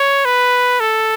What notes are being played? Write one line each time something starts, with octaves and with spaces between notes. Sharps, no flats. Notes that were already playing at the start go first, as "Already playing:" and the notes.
Already playing: C#5
B4
A4